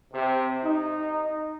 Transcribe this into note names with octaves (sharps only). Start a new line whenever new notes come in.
C3
D#4